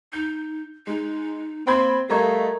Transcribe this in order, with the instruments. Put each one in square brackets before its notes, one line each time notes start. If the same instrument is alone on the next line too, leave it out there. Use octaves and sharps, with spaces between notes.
[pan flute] D#4 [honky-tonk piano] G6
[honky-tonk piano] G#3 [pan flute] D#4
[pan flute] A#3 [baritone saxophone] C4 [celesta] C5 [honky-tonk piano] G5 B5 G#6
[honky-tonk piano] G3 D#5 C#6 [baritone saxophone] A3 [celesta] A#4 A#5 G#6 [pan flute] F5